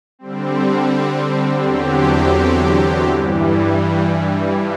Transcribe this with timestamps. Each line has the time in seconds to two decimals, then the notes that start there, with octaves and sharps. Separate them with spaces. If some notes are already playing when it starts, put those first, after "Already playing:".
0.19 D3 G3 C4
1.62 E2 D3 F#3 C4 G4
3.06 G2 E3 G3